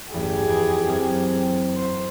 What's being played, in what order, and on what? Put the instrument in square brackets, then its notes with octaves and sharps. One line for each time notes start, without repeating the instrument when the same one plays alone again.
[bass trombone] A1 [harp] E2 G2 [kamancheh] G4 G#4
[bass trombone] F2 [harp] B4 G#5 D7
[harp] F#2 [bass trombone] C4
[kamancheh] C5